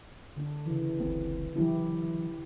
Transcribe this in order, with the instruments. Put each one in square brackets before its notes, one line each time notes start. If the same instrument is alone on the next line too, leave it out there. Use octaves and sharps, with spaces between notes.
[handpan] D3 D4
C#3 E3
[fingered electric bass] F#1 C#2 C4
[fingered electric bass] E3 F#3 D4 [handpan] E4 G4